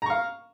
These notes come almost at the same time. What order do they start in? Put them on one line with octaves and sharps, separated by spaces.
A#5 C#6 F5